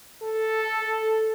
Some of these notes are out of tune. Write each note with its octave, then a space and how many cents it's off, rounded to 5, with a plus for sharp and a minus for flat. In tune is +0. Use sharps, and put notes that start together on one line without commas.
A4 +0